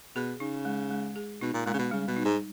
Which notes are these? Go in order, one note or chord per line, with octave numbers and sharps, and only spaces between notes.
B2 G#4
C#3 D#4
G#3
G#3
G#4
B2 D#4
A#2
A#2 G#3
C#3
B2
C#3 G3
B2
D#4
G#2